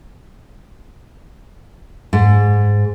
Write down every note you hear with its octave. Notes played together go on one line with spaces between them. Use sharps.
G#2